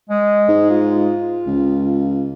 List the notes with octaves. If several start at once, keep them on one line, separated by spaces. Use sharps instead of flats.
G#3
G#2
F4
C#2